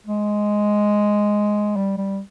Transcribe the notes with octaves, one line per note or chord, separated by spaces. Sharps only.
G#3
G3
G3